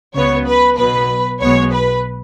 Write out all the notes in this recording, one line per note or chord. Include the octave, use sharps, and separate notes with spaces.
C#2 C#3 F#3 B3 C#5
B4
B1 B2 F#3 B3 B4
B1 B2 G#3 B3 C#5
B4